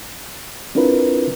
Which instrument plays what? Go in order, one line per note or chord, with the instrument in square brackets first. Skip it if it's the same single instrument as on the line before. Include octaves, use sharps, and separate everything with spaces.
[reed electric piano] C4 D4 E4 F4 A#4 B4